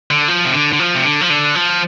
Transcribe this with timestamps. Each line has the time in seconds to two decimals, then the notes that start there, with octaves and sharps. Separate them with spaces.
0.10 D3
0.28 F3
0.45 C3
0.53 D3
0.72 D3
0.79 F3
0.95 C3
1.04 D3
1.21 F3
1.30 D3
1.55 F3